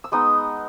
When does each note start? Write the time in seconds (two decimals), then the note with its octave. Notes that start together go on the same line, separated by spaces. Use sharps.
0.04 E6
0.12 G#3 B3 D#4 D#6